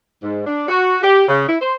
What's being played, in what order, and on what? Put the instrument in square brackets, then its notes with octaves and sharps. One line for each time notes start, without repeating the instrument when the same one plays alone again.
[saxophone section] G#2
D4
F#4
G4
C#3
E4
C5